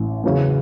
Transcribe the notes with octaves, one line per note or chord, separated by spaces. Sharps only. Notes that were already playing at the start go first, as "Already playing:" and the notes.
Already playing: A1 A2
E2 C#3 F#3 C#4